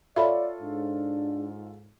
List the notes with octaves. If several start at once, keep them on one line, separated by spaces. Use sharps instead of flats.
F4 A4 C#5 D5 E5 B5
G#2 D4